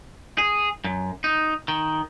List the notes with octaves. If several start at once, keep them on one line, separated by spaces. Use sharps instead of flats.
G#4
F#2
D#4
D#3